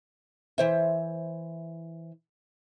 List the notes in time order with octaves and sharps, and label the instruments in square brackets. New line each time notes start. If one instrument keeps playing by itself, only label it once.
[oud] E3 C5 E5